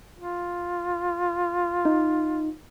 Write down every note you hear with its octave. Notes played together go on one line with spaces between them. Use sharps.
F4
D#4